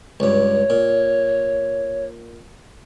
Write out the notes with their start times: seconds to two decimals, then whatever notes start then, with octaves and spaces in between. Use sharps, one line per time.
0.20 C#2 G2 C#5
0.70 A#2